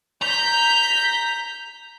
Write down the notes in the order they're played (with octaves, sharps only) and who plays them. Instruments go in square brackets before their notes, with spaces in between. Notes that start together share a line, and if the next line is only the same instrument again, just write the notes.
[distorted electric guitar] A#5 [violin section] G6 B6